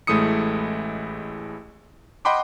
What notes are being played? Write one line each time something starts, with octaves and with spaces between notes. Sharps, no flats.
A1 G#3 A3 E4 D#6 C#7
D#5 F#5 G5 B5 C6 D6